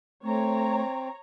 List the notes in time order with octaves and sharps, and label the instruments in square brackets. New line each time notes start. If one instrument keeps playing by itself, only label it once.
[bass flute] A3 [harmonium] C4 [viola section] C#5 A#5